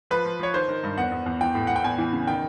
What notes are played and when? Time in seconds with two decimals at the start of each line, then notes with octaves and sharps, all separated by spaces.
0.11 F3 B4
0.25 F3
0.39 F3 C#5
0.54 D#3 C5
0.68 D#3
0.83 G2
0.97 E2 F#5
1.12 E2
1.26 E2
1.41 E3 G5
1.55 A2
1.67 A2 F#5
1.76 G5
1.84 E2 G#5
1.98 E3
2.13 C#3
2.27 D#3 G5